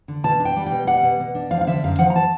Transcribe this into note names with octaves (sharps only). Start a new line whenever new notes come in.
D3
B2 A5
D4
G5
G3
B2 G5
G3 F#5
B2
B2
D4
F3 F5
F5
D3 E5
F#2 F5
F3 F#5
A#5
A5